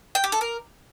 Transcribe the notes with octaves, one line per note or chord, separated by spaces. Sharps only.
G5
G4
A4
A#4